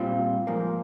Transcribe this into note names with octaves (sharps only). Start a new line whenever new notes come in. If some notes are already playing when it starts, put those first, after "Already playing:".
Already playing: A#2 G3 C4 F4
G#2 F3 A#3